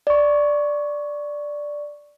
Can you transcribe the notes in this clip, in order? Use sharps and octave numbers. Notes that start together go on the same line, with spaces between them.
D5 C#6